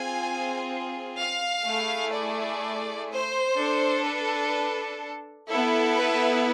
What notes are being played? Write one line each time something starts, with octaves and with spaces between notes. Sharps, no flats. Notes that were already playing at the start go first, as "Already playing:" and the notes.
Already playing: C4 F4 G#4 G#5
F5
A3 E4 G#4
D5
C5
D4 A4
B4
B3 E4 A4
B4